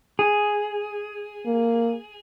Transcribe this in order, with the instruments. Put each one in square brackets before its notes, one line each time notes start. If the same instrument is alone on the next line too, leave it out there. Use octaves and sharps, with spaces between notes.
[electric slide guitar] G#4
[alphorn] A#3